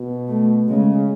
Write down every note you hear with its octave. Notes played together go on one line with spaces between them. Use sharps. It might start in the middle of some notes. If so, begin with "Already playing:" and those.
Already playing: B2
A3
C#3 G#3